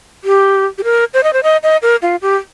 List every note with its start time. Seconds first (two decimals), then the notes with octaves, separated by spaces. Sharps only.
0.24 G4
0.78 G4
0.84 A#4
1.14 C5
1.23 D#5
1.33 C5
1.43 D#5
1.63 D#5
1.82 A#4
2.02 F4
2.22 G4